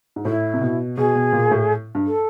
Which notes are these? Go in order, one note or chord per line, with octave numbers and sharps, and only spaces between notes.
G#2
A2 E4
C3
B2
B2 G#4
B2
A#2
A2
G2
A4